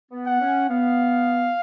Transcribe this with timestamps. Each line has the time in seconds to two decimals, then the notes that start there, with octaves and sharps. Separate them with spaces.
0.11 B3
0.26 F#5
0.40 C#4
0.69 B3 F5